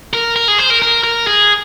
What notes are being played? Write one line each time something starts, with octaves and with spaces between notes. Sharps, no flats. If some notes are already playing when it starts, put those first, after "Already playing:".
A#4
A#4
G#4
C5
A#4
A#4
A#4
G#4